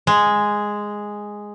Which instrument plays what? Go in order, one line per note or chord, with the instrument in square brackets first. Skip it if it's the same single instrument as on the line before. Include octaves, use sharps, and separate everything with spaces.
[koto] G#3